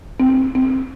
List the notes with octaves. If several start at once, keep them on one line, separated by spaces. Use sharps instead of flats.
C4
C4